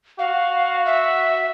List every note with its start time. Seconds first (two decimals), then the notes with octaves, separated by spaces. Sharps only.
0.19 F#4 F5
0.86 E5